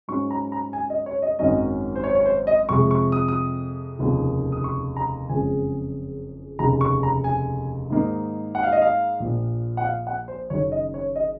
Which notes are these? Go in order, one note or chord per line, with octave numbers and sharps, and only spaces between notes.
G#2 F#3 C#4 C#6
A#5
A#5
G#5
D#5
C#5
D#5
G#1 F#2 D#3 F#3 C#4 D#5
C5
C#5
C#5
C5
D#5
F2 C3 F3 G#3 C#6
C#6
D#6
D#6
F1 D#2 C#3 F3 A#3
D#6
C#6
A#5
F#1 F2 C#3 G#3 G#5
F1 D#2 C#3 A#5
C#6
A#5
G#5
G#2 D#3 A#3 D#4
F#5
F5
D#5
F5
A#1 A#2 F3
F#5
F5
F#5
C5
F#1 F#2 D#3 C#5
D#5
C#5
D#5